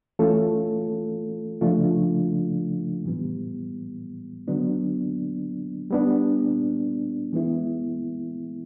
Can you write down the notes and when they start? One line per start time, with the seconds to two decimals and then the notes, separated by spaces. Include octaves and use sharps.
0.19 E3 A3 C#4 F4 A4
1.61 C#3 F3 A3 D4 F4
3.05 A2 E3 G3 B3
4.48 D3 F#3 B3 D4
5.91 G3 B3 D4
7.33 E3 G#3 B3 E4